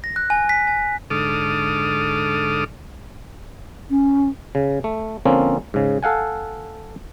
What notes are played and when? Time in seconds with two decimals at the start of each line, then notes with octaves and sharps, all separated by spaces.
0.04 A#6
0.16 F#6
0.30 G#5
0.49 B6
0.67 G#5
1.10 G#2 D3 A4 D6 D#6 F6
3.90 C#4
4.55 C#3
4.84 A3
5.25 D3 F3 A#3 C4 C#4
5.74 G#2 C#3
6.03 A4 F5 F#5 G#5